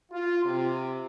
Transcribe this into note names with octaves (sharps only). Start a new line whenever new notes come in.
F4
C3